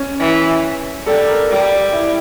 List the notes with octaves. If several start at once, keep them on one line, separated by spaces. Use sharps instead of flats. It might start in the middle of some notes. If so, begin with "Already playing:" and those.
Already playing: C#4
E3
G3 A4
A#4
G3
G4
E4